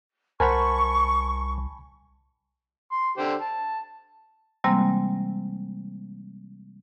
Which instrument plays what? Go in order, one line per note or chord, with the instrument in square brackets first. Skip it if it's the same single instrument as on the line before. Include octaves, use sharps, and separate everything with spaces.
[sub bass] C2 [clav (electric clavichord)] A#4 C5 F#5 [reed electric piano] G#5 A5 B5 [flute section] C#6
[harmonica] C6
D3 G4 C5
A5
[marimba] C3 E3 G3 G#3 A#3 C4